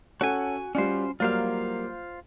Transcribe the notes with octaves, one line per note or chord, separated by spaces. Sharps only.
C#4 F#4 A4 F#5 G#5
G3 C#4 F4 F#4 C5 D5
F#3 G3 A#3 F4 C5 F5